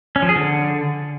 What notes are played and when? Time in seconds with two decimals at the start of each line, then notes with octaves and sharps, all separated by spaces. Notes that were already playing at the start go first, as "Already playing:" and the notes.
0.16 C#4
0.22 F3
0.29 G#4
0.36 D3